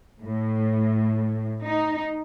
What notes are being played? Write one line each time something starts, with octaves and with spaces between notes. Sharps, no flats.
A2
D#4